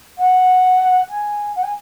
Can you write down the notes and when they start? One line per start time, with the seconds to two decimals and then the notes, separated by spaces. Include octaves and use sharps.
0.18 F#5
1.10 G#5
1.56 F#5
1.63 G#5